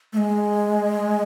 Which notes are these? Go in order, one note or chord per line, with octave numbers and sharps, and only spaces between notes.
A3
G#3